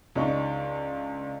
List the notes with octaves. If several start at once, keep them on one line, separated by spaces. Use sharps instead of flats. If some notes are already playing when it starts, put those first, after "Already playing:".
C#2 D4 D#4 C#6